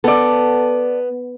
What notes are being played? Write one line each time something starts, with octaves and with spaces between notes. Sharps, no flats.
B3 A4 D5